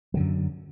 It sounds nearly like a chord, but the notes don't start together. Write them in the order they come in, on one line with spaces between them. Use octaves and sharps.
F#3 D3 F#2